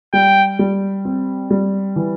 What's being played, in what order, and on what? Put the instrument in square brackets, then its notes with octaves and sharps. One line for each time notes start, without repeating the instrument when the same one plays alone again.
[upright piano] G3 [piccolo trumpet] G5
[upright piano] G3
C4
G3
E3